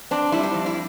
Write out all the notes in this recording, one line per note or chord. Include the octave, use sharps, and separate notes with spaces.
C4 D4
G3 E4
D4
F2
E4